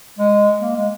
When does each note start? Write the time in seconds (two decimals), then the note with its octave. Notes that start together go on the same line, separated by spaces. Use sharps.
0.19 G#3
0.61 A#3
0.77 G#3